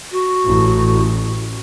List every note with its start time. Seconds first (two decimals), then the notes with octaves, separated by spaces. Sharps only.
0.12 F#4
0.43 A1